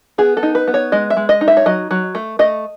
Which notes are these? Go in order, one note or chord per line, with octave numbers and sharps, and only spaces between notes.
B3 G#4
A4
D#4
B4
B3
C#5
G#3 D#5
E5
G#3
D#5
D#4
E5
C#5
F#3 D#5
F#3
A3
A3 D#5